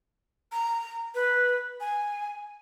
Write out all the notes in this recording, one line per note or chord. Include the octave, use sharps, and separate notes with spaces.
A#5
B4
G#5